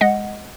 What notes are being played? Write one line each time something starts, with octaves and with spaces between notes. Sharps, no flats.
G#3 D#5 F#5